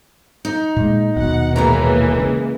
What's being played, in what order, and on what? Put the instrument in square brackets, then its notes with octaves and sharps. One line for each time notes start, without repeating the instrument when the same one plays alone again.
[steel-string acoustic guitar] D#4
[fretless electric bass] A#2 G#3
[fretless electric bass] D#1 B1 B2 [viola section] F#5
[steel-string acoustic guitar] A2 C#5 A#5 [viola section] E3 G#3 A#3
[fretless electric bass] C#3